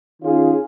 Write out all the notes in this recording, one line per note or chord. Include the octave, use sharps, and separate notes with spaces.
D#3 C#4 F4 G#4